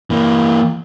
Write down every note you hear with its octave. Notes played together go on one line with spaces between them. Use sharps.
E3 A#3